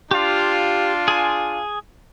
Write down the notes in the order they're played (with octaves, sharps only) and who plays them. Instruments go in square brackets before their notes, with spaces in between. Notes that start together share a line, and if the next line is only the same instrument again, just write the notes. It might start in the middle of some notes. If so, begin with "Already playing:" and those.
[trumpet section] D4 F4 [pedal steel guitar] G4 F5
[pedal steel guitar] G#4 G#5